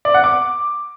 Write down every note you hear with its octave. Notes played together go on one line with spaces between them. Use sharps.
D5
F#5
D6